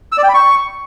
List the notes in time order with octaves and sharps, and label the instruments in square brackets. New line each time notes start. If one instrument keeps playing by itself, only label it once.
[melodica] E6
D5
G5
B5
C#6